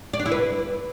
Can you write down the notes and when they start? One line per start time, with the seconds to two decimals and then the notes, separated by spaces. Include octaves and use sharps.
0.13 D5
0.20 D4
0.26 E4
0.32 B4